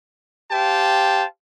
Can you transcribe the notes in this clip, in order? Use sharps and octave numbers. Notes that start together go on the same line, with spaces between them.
G4 C5 F5 G5 A5